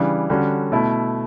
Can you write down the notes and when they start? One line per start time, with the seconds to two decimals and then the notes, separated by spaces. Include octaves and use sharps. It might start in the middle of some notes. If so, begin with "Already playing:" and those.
Already playing: C#3 E3 G3 D4
0.30 D3 G3 C#4 F#4
0.72 B2 A3 E4